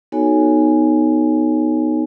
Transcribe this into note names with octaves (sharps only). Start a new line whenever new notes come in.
B3 D#4 F#4 A4 C#5 G#5